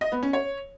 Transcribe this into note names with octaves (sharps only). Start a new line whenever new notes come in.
D#5
B3
C#4
C#5